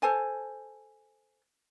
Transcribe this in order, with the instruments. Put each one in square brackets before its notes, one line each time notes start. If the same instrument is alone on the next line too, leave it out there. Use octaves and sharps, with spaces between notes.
[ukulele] A4 C5 G#5 A5